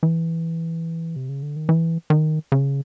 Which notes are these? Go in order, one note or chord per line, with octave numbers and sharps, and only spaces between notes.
E3
C3
C#3
D3
D#3
E3
D#3
C#3